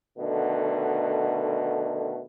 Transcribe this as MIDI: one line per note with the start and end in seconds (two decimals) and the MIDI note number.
0.18 2.20 47
0.18 2.20 50
0.18 2.20 51
0.18 2.20 57